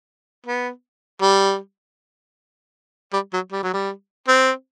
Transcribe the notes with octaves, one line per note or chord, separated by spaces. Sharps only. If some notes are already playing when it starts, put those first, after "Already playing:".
B3
G3
G3
F#3
G3
F#3
G3
C4